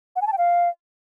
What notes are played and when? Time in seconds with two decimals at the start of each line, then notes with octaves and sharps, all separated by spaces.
0.16 F#5
0.21 G#5
0.27 A5
0.32 G5
0.38 F5